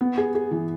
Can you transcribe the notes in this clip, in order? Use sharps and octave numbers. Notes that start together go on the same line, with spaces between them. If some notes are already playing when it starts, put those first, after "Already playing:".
B3
G#4
G#4
E3